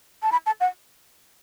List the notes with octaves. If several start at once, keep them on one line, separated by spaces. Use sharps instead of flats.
A5
B5
A5
F#5